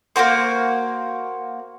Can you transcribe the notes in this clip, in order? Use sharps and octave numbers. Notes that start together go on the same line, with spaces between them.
A#3 C4 F#4 C5